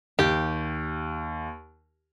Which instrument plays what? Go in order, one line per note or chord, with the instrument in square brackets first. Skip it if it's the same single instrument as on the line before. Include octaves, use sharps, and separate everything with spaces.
[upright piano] D#2 [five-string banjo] G4